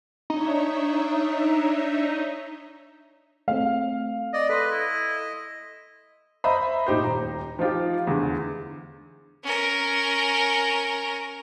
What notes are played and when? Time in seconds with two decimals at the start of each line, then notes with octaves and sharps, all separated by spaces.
0.30 D4 D#4 C#5 E5
3.48 A3 C4 F5
4.34 D5 D#5
4.49 A4 B4 D#5 C6
4.71 E4
6.44 C5 D#5 E5 A#5 B5
6.87 A#2 D#4 G4 C5
7.04 D#1 A#5
7.59 F3 D#4 F4 G4
8.07 E2 D3
9.43 C#4 A#4